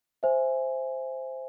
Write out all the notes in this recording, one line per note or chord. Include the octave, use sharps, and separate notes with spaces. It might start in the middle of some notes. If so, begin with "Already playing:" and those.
C5 E5 G#5